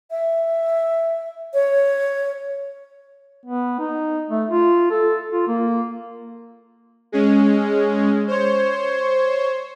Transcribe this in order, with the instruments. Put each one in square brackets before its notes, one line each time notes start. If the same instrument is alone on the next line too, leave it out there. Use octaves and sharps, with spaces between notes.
[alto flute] E5
C#5
[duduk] B3
D#4
A3
F4
A4
F4
A#3
[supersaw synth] G#3 C#4
C5 C#5